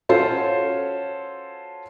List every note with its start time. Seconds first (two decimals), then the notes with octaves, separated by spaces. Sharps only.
0.09 C#4 F4 F#4 A4 C5 C#5